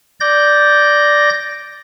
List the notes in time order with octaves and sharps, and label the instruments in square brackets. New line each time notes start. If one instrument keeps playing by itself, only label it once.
[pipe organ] D5 G6 A#6